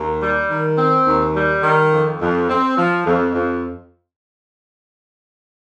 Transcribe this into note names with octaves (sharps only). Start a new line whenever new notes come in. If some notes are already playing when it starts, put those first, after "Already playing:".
Already playing: D#2
G3
D#3
C4
D#2
G3
D#3
F2
F2
C4
F3
F2
F2